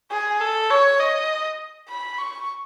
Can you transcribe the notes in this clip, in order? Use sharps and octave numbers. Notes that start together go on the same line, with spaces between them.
G#4
A4
C#5
D#5
B5
C#6